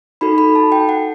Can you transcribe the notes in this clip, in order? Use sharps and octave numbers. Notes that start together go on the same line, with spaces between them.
D#4 F#4 A4 B5
B5
A5
G5
F#5